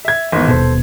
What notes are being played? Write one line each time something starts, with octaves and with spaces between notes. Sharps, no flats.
E5 G#6
G#1 E2
D#1 B2 A4 C5